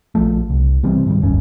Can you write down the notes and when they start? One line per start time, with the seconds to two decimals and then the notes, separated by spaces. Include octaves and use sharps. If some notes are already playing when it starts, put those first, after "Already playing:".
0.15 A#1 F3 A3
0.50 C2
0.83 C3 E3 G3 C4
1.06 G#2 D#3 G3
1.22 F#1 D2 G2 C#4